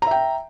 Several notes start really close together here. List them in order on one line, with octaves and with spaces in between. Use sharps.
A#5 E5 G5